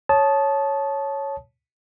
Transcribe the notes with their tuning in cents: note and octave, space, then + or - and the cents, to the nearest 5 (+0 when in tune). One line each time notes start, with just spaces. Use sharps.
C#5 +0 A5 -15 D#6 +0